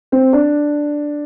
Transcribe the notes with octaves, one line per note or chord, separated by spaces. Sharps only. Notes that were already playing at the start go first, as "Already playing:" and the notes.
C4
D4